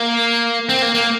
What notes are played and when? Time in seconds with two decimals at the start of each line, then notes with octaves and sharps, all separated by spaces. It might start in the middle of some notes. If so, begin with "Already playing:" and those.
Already playing: A#3
0.69 C4
0.82 A#3
0.95 A#3